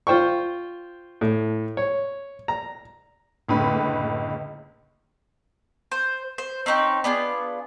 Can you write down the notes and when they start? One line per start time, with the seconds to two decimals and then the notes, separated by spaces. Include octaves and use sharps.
0.07 F4 C5 G5 C#6
1.21 A2
1.77 C#5
2.48 A#5
3.49 F#1 C#2 A2 D3 B4 B5
5.92 C5
6.38 C5
6.66 C4 C#4 D#4 G5
7.04 B3 D4 F4 G#4